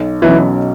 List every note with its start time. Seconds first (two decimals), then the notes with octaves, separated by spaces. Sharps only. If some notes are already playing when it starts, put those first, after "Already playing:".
Already playing: B1
0.22 B2 E3 F#3 C#4